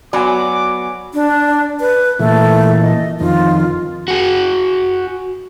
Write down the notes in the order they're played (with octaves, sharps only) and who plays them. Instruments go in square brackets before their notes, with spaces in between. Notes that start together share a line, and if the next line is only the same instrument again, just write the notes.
[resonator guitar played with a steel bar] F#3 B3 F#4 [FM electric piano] D5 G#5 [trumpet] D6
[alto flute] D4
B4
[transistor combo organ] A#2 E3 [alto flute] A3
[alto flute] D#5
[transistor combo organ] F2 D#3 [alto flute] F4
[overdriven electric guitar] F#4 G#4